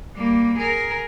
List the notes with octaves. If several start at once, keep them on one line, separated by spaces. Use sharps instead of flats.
G3 A#3
G#4 A#4